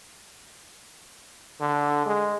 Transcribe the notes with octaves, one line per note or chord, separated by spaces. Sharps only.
D3
G#3